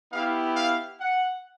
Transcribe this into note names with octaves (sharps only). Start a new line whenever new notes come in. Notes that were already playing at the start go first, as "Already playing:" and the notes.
B3 E4 G4 F5
F5
F#5